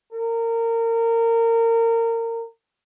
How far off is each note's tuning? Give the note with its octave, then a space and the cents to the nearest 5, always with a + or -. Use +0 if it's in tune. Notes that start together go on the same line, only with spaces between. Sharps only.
A#4 -25